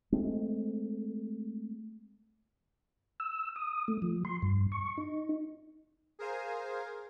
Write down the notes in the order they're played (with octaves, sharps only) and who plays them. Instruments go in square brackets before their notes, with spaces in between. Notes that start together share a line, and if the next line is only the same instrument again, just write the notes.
[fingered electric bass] G#3 A3 C4
[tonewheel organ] E6
D#6
A3
F3
C6
G2
C#6
D#4
[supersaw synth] G#4 A#4 C5 F5 G#5